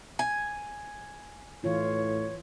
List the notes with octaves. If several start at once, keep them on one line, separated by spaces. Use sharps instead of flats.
G#5
A2 E3 F4 C#5